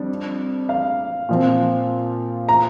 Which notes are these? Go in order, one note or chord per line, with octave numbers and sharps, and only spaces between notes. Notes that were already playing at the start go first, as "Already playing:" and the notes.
Already playing: F2 G3 D4
F5
A#2 F3 C4
A#5